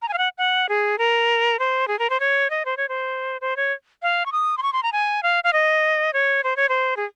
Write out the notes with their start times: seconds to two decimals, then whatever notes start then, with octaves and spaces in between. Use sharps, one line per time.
0.02 A#5
0.08 G#5
0.13 F5
0.18 F#5
0.38 F#5
0.69 G#4
0.98 A#4
1.59 C5
1.88 G#4
1.99 A#4
2.10 C5
2.20 C#5
2.50 D#5
2.65 C5
2.77 C#5
2.89 C5
3.41 C5
3.56 C#5
4.02 F5
4.26 C#6
4.32 D#6
4.58 C6
4.63 C#6
4.73 C6
4.83 A#5
4.92 G#5
5.23 F5
5.44 F5
5.53 D#5
6.13 C#5
6.44 C5
6.57 C#5
6.69 C5
6.97 G#4